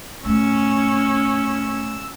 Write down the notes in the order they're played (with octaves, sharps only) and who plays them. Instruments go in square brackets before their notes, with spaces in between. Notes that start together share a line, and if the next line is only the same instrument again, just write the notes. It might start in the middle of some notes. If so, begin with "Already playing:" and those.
[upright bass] A2 [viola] C#4 [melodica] E6